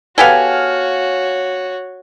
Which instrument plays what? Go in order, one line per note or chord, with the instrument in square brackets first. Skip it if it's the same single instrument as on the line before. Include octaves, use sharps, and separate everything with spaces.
[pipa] B3 G4 A4 [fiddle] F#4 C#5 [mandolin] F5 G#5